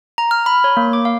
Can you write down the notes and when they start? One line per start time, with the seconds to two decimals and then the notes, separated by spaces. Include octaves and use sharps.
0.18 A#5
0.31 F6
0.46 B5
0.64 C#5
0.77 A#3
0.93 D6
1.05 F5